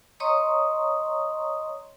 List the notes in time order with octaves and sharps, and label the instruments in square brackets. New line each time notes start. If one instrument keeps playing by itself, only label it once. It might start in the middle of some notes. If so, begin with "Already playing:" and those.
[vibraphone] C#5 D#5 A#5 C6 C#6 D#6